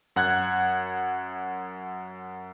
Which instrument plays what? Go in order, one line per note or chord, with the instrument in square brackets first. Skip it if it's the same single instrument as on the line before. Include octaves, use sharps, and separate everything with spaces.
[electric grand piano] F#2 F#5 F#6 G#6